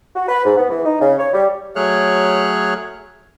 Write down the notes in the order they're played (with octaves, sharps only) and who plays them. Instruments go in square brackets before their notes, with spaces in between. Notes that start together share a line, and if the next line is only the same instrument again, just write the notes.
[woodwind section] F#4
B4
G#2
B3
E3
D#4
C#3
C#5
G3
[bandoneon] F#3 A3 G#4 C#5 F6 F#6